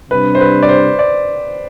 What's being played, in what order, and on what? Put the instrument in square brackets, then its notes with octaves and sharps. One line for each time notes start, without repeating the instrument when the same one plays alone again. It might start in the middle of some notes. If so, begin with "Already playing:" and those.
[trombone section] C3 G3 D4 [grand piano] B4
[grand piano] C5
B4
D5
C5
D5